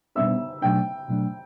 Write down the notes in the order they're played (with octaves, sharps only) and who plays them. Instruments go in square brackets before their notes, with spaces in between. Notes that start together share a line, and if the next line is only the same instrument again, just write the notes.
[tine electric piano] B2 G3 B3 D4 [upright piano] E5 E6
[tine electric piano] B2 F#3 A3 D4 [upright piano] G5
[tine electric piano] B2 F#3 A3 D4